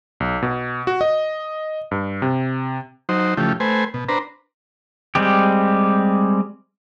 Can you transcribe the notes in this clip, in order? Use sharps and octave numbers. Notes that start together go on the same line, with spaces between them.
B1
B2
F#4
D#5
G2
C3
F#3 D#4 C5
C#3 E3 F3 A3 G4
A3 B4 C5 G#5
B2
D4 B4 C5 A#5
G3 G#3 C4 G4